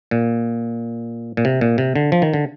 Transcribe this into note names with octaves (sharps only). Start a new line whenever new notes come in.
A#2
A#2
C3
A#2
C3
D3
F3
D#3
D3